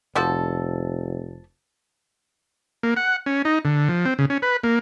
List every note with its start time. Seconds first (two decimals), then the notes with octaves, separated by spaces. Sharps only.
0.15 F1 F3 F#4 A4
2.83 A#3
2.97 F#5
3.26 C#4
3.45 D#4
3.65 D3
3.89 F3
4.05 C4
4.19 C#3
4.30 C#4
4.42 B4
4.63 A#3